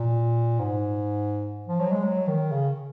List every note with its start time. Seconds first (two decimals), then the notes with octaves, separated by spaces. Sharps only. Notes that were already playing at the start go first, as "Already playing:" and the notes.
Already playing: A#2
0.59 G#2
1.68 F3
1.79 F#3
1.92 G#3
2.04 F#3
2.28 D#3
2.52 C#3